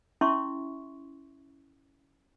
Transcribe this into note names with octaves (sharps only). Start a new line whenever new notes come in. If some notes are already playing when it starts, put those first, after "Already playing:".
C#4 E4 E5 C6 C#6